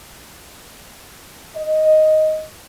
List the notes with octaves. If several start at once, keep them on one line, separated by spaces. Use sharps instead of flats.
D#5